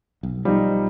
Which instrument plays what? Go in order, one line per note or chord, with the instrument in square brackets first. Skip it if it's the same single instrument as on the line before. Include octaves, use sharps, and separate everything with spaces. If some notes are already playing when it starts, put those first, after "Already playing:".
[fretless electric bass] B1
[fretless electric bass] B1 F3 [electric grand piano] G3 D#4